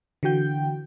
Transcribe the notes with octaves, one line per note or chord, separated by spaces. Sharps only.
D3 E3 F#4 G5 G6